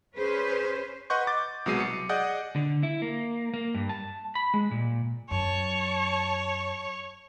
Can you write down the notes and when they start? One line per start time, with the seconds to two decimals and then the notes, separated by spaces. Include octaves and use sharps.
0.17 C#4 G#4 B4 C5
1.10 B4 D#5 F#5 C6 C#6 G6
1.27 D6 A6
1.66 C2 B2 F#3 G#3 C7 D#7
1.80 C#7
2.09 G#4 D5 D#5 F#5 D#6 G6
2.56 D3
2.83 E4
3.02 A#3
3.54 A#3
3.75 G2
3.89 A5
4.35 B5
4.54 G#3
4.71 A#2
5.31 F#2 C#5 A5